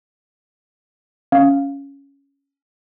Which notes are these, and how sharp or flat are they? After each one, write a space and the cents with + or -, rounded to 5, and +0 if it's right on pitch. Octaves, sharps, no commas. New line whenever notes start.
C#4 +5 F5 +0